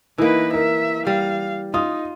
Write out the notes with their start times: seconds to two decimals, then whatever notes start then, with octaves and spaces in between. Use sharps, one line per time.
0.18 E3 A#3 D#4 E4 B4
0.54 A#4 E5
1.07 G3 F5
1.74 D#4 F4 D#6